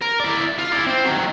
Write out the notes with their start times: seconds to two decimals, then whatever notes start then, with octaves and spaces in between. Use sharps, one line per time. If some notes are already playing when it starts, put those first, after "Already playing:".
0.01 A#4
0.20 E4 D5
0.59 F4
0.72 E4 D5
0.87 C4
1.04 D#3 F#3